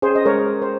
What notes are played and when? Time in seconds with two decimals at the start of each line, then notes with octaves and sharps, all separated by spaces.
0.02 C#4 G#4 C5
0.15 D#5
0.25 G#3 A#4 C#5
0.49 G#3
0.62 C5